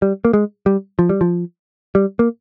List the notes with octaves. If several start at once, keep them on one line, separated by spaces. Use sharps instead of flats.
G3
A#3
G#3
G3
F3
G3
F3
G3
A#3